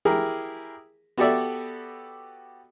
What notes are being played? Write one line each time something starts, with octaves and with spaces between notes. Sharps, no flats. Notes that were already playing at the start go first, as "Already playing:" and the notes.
E4 G4 G#4 A#4
B3 F#4 G4 A4 D5 E5